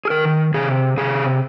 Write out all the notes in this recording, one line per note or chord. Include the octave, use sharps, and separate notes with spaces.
G#4
D#3 A#4
C3 G#4
C3 G#4